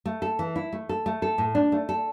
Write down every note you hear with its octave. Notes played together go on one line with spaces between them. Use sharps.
A3
A4
E3
E4
A3
A4
A3
A4
A2
D4
A3
A4